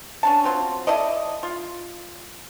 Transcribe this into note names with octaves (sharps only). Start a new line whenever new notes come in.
C#4 D4 A5
F#3 C4 F4
E4 A4 D5 D#5
F4